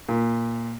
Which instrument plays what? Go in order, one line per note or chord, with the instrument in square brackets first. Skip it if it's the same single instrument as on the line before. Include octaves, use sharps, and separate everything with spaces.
[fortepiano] A#2